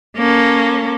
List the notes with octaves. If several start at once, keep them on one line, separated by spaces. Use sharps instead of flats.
A#3 C#4 A4